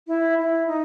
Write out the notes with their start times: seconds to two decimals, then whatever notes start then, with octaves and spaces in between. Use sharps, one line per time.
0.07 E4
0.38 E4
0.67 D#4